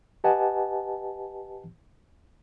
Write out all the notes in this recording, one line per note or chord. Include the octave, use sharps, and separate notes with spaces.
G4 B4 D#5 F#5 G#5 A5